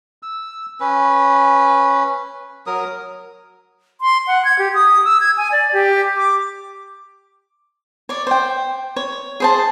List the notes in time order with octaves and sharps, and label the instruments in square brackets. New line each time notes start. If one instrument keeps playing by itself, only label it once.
[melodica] E6
C#4 B4
F#3 A#4 D#6
[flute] C6
F#5
G#6
G4
D#6
E6
G#6
G#5
D5
G4
D6
[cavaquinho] C#5 D5
C5 G5
C#5
G#4 C5 A5